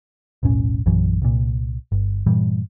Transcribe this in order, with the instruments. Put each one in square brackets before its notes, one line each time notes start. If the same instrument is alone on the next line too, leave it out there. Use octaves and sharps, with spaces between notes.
[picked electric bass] E1 B1 A2 C#4
A#1 F#2 E3 F#3
C2 A#2
G1
G2 A#2 E3 G3